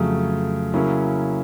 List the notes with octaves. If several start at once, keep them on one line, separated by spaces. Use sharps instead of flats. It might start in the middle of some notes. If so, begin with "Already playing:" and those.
Already playing: F2 C#3 F#3 A3
C#3 F#3 A#3 C#4 E4